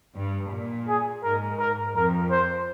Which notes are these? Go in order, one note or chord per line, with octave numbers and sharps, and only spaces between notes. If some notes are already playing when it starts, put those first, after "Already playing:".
G2
A#2
G#4
G#2 A#4
A#4
F2 A#4
C5